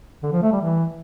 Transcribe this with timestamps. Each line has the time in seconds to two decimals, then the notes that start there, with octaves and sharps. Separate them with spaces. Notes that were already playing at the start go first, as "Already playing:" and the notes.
0.23 D3
0.33 F3
0.42 A3
0.52 G3
0.62 E3